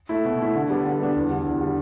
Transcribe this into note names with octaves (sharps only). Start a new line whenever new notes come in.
A3 E4
B2
A3 E4
D3
G3 B3 D4
D3
G3 B3 D4
E2
D3 G3
E2
D3 G3